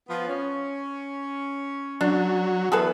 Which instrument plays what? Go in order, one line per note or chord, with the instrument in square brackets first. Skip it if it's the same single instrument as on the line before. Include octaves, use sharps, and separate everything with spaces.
[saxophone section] F3 B3
C#4
[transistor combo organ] F#3 [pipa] D4
[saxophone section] E2 [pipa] G#4 A4 B4